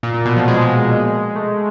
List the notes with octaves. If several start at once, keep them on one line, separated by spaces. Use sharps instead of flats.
A#2
A#2
B2
F3
G#3
A3